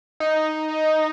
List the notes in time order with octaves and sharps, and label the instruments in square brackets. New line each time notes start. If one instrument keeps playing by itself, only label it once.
[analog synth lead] D#4